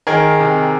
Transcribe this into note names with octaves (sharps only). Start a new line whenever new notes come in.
D#3 G#4 A#4
C3